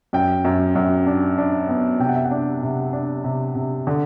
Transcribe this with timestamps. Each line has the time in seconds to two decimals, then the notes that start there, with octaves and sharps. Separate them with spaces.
0.13 F#2 G5
0.45 F#2
0.75 F#2
1.07 D4
1.38 D4
1.69 B3
2.00 C3 G5
2.08 F#5
2.16 E5
2.24 F#5
2.31 D4
2.63 C3
2.93 D4
3.24 C3
3.55 C3
3.87 D3